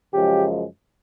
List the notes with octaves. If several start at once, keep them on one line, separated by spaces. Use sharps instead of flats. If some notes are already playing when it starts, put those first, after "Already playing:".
F#2 C#3 F3 G#3 G4